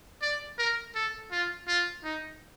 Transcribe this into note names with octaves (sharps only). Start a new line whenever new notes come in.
D5
A#4
A4
F4
F4
D#4